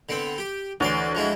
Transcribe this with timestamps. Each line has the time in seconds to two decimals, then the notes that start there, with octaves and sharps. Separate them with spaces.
0.09 D3 B3 C4
0.38 G4
0.80 D2 E3 C#5 D5 C6
1.15 F3 G#3 E4